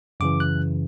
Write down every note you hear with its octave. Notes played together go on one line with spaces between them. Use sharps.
F#2 C#3 E3 D6
F#6